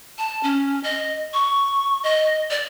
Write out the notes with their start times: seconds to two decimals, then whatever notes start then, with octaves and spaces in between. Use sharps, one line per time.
0.18 A5
0.43 C#4
0.83 D#5
1.33 C#6
2.03 D#5
2.50 D5